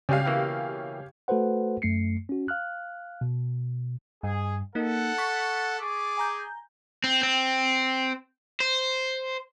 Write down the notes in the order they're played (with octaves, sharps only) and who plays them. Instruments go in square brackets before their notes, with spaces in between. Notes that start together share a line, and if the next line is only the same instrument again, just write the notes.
[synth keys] C#3 [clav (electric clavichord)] G3 G#3 [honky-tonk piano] C#4 G4 F5
[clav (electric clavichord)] B2 E3 A#3
[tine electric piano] A3 F#4 A4 B4 C5 F#5
F#2 A3 C7 C#7
C#4 F#4
F5 F6 F#6
B2
[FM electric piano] G2 [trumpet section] G#4
[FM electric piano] A#3 D#4 [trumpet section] A4 F#5
[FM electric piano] C#6 A6 B6
[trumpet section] G#4 D6
[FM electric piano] G#5 A#5 G6
[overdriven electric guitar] C4
C4
C5